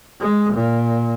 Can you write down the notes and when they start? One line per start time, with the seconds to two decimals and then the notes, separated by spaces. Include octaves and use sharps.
0.21 G#3
0.54 A#2